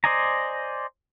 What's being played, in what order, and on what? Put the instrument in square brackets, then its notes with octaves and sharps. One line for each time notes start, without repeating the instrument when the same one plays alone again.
[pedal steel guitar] C5 D5 D#5 G#5 A#5